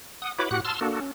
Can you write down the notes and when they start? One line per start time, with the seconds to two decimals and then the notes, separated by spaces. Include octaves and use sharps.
0.22 F#5 D#6
0.39 E4 F#4 B4 C#5 B5 D6
0.51 A2 F#4 G4 F#5 F#6
0.65 A5 C6 E6 F6
0.81 A#3 D4 F#4 A4
1.00 C#4